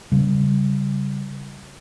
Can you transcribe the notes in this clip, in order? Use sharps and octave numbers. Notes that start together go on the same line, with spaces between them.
C#3 G3